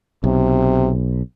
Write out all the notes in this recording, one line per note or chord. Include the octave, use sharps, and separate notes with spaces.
B1 C3